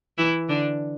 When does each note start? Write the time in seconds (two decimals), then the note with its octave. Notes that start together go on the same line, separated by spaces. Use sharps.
0.18 E3 E4
0.49 D3 D4